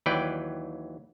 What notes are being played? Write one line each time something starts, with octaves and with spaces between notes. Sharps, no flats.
D#2 E3 F#3 B4 D5 G5